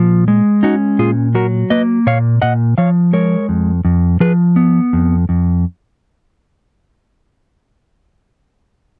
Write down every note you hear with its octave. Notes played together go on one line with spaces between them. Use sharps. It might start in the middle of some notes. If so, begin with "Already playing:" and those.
Already playing: A#2 F3
G#3
C#4 D#4 F#4
A#2 F4 G#4
F#3 F#4 A#4
A#3 B4 D#5
A#2 C#5 F5
A#2 D#5 F#5
F3 C#5 F5
G#3 A#4 C#5
F2
F2
F3 G#4 B4
B3
F2
F2